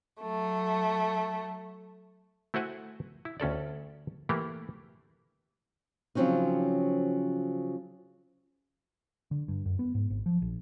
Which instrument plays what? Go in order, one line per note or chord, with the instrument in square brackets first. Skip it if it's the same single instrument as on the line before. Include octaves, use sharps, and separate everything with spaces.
[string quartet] F#3 A3
[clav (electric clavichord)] A3 E4 F#4 C5 F#5 G#5
E4
D2 C#4 A4 D5
E3 A3 A#3 E4 G4
[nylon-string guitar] C#3 F3 F#3 C4 C#4 D#4
[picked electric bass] D3
G2
F#2
B3
G#2
G#1
F3
A#1